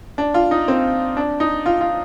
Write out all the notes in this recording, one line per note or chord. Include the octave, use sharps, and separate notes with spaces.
D4
F4
D#4
C4
D4
D#4
F4
F4